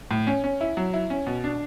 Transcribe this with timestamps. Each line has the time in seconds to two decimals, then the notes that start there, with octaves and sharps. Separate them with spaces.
0.11 A2
0.27 C#4
0.44 C#4
0.61 E4
0.77 F#3
0.94 E4
1.10 C#4
1.27 B2
1.44 D4